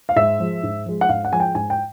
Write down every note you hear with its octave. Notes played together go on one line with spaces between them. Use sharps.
F5
G#2 E5
F3 G#3
G#2
F3 G#3
F#5
G#2 F5
F#5
F3 G#3 G#5
G5
G#2 G#5
G5